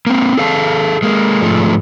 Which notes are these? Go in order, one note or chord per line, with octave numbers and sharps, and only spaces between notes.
A#3 C4
G#4 A4 F5 G#5 A5
G#3 A#3
G#2 F3 G#3 A3